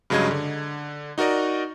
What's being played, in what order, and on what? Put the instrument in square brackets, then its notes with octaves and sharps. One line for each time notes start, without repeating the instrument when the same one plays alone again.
[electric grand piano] G2 C#3 F#3 G#3 D#5 G#6
D3
D#4 F#4 A#4 D5 D#5